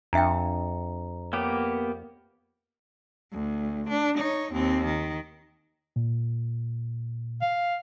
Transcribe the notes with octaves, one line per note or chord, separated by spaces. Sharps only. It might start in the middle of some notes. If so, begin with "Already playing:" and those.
F2 D4 E5 G5 A#5
A#3 B3 G4 C#5
D2
D4
D#4 C#5
D#2 C4
D#3
A#2
F5